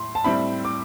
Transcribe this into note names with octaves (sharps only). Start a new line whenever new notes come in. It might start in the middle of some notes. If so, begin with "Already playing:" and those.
Already playing: A2 C6
A5
A2 G3 C4 E4 B5
D6